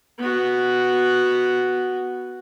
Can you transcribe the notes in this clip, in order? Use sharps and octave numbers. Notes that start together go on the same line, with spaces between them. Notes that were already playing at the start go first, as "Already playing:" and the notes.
B3 F#4